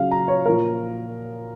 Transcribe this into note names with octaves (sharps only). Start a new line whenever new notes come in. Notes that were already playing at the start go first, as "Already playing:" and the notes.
Already playing: C#3 F#3 F5
A#5
C#5
A#2 F3 A#4